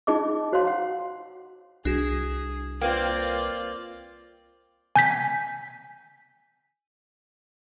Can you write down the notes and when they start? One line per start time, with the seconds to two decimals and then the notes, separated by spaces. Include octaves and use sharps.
0.07 D#4 F4 G#4 D#5 D6
0.53 F#4 C5 C#5 F5 C6
0.64 F#5 A#5
1.85 C2 D4 F#4 G#4
2.81 A#3 C4 F4 B4 D5 G5
4.96 G#5 G6 B6